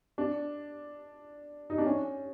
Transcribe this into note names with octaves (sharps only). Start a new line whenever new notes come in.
D4
D#4
D4
C#4